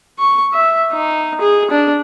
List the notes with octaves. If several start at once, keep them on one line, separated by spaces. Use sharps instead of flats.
C#6
E5
D#4
G#4
D4